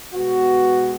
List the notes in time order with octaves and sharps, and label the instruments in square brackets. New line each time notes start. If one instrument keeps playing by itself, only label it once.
[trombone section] B2 G#3 B3 F#4